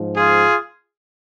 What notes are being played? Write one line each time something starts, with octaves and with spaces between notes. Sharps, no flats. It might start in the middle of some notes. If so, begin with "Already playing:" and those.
Already playing: G#2 F3
F4 G#4